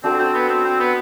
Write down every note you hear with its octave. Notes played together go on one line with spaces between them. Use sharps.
C4 D4 F#4 A4
C4
B3
C4
C4
B3